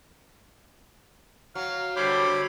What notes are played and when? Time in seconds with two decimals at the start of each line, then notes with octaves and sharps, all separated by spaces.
1.55 F#3 F5
1.96 D3 G3 C5 C#5 B5 D6